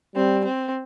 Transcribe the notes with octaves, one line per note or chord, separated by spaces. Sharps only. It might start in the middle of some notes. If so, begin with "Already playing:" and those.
G3 C4
C4